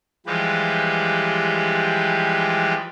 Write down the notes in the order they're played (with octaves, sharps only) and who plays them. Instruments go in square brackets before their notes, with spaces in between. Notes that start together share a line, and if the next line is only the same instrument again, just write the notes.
[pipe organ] E3 F3 G3 G#3 G4 B4